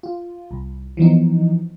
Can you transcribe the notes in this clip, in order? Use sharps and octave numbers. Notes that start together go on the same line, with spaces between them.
F4
C2
E3 F3 B3 D#4